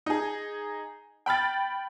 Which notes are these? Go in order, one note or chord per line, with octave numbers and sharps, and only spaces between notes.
D#4 G#4
G5 B5 F6 A6